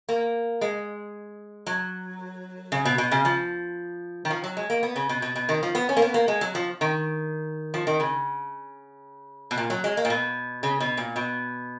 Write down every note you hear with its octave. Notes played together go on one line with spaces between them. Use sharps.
A#3
G#3
F#3
C#3
B2
B2
C#3
F3
D#3
F3
F#3
G#3
A#3
B3
C#3
B2
B2
B2
D#3
F3
B3
C#4
A#3
B3
A#3
G#3
F#3
F3
D#3
F3
D#3
C#3
B2
A#2
F#3
G#3
A#3
A#2
B2
C#3
B2
A#2
B2